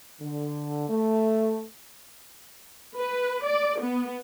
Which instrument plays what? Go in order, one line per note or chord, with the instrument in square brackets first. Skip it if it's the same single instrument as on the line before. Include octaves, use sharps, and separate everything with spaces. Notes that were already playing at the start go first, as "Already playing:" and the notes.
[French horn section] D3
A3
[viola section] B4
D5
B3